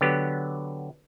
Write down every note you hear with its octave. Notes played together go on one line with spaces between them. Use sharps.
D3 F#3 B3 G4